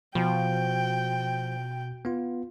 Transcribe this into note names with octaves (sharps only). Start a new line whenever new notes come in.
B2 F3 F#4 G5
B3 F4